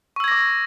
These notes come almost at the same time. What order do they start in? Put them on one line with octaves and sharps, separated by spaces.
C#6 E6 G#6 A#6 D6